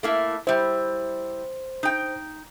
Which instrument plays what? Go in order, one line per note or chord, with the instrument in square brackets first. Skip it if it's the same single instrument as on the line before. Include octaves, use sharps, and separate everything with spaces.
[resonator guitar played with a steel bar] A3 A#3 E4
[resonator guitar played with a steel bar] G3 E4 [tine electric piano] C5
[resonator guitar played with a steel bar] D#4 G5